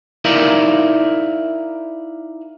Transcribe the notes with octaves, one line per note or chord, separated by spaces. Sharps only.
D#4 E4 A#4 D5 E5 F5